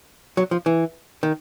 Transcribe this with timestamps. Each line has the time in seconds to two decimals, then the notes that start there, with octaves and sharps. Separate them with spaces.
0.37 F#3
0.51 F3
0.66 E3
1.23 D#3